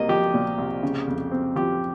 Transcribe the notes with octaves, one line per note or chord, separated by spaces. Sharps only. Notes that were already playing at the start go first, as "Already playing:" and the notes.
Already playing: C2 A#3 D#5
F3 G4
A#2
C2
C#3
F2
C4
F3 G4